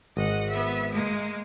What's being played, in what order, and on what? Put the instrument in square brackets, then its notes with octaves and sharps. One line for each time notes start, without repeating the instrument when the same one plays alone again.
[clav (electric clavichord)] G#1 [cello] D#5 F#5
[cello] B3 E5
G#3 A#3